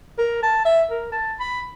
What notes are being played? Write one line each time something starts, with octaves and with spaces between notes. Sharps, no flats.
A#4
A5
E5
A#4
A5
B5